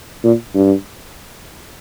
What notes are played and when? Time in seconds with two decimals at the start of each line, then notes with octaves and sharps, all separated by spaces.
0.24 A#2
0.55 G2